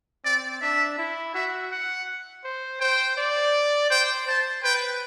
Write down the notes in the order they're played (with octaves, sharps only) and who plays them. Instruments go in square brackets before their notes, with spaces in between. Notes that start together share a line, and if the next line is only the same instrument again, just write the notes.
[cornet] C4 [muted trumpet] D5
[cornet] D4 [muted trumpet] E5
[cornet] E4
[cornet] F#4 [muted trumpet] E5
[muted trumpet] F#5
[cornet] C5
[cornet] C5 [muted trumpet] G5
[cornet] D5
[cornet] C5 [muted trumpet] G5
[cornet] C5 [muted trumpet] A5
[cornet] B4 [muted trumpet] G5